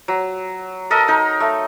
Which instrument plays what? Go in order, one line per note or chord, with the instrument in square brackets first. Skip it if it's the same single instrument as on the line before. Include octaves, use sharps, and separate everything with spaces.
[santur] F#3
A4 A#4 D#5
D#4 A#4
A3